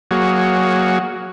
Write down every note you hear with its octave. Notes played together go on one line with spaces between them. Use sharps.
F#3 A#3 F#4 G#4 C#5